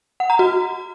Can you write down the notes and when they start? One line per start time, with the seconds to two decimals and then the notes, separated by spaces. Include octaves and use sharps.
0.20 F#5
0.30 A#5
0.39 F#4